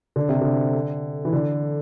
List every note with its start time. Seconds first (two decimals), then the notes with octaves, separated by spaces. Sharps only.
0.16 D3
0.29 C3
0.41 D3
1.25 E3
1.33 D3